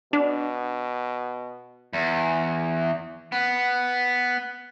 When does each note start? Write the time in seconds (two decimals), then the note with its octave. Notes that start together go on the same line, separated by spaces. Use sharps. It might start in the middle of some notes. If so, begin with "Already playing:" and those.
0.13 B2 D4
1.93 E2
3.32 B3